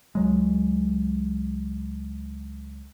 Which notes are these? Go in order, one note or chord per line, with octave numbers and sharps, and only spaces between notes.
C#2 F#3 G#3